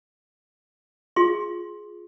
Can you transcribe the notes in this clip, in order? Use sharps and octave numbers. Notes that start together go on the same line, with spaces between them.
F4 G#4 C6